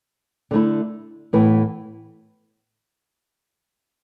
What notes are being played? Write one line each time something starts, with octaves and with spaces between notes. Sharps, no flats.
D3 A3 E4
A2 E3 B3